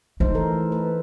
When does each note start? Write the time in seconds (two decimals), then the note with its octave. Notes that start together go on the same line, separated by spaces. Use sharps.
0.20 A3 D#4 C5
0.35 E3 A4 A#4
0.72 B4